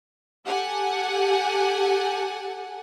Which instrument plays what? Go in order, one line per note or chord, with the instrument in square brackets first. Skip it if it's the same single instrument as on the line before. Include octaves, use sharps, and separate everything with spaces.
[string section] G4 A4 F#5 G#5